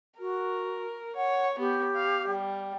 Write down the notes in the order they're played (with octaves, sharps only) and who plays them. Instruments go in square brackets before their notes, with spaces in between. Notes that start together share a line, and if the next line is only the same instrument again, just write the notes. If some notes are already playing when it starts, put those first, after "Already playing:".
[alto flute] F#4 [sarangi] A#4
[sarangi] C#5 [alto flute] F#5
[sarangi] B3 [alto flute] G4
[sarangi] F5
G3